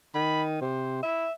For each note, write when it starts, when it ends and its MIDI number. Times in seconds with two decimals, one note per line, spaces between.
0.14 0.60 51
0.14 0.43 83
0.61 1.03 48
0.61 1.03 72
1.03 1.26 64
1.03 1.32 76